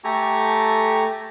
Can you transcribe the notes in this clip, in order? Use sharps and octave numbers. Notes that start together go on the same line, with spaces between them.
A3 G4 A4 G#5 A#5 C#6